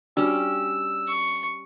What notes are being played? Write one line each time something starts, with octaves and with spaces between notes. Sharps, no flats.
G3 C#4 D4 F#4 E6
C#6